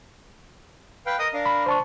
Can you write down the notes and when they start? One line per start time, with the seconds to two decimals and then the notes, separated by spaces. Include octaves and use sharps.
1.06 B4 F5 G5
1.19 A#4 D#5 D#6
1.34 D4 A#4 F5
1.46 B5
1.66 D4 C5 A5 C#6